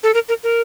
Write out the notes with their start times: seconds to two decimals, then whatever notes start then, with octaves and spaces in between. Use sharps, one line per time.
0.03 A4
0.14 A#4
0.29 A#4
0.43 A#4